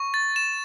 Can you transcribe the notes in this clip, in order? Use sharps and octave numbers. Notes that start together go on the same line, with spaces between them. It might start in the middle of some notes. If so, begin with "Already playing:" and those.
Already playing: C#6
A6
E7